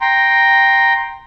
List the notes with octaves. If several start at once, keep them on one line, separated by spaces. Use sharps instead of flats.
G5 A#5 C6